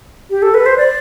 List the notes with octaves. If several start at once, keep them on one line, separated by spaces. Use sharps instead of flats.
G4
A4
B4
C5
D5